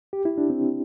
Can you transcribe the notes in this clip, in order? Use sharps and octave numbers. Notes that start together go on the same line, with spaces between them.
G4
E4
D4
C4